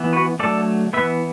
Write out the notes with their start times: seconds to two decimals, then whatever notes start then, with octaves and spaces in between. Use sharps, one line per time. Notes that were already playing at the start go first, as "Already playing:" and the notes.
Already playing: E3 B3
0.13 F#4 B4
0.39 D3 F#3 A3 A4 D5
0.93 E3 B3 B4 E5